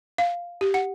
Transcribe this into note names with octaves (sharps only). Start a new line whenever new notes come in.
F5
G4
F#5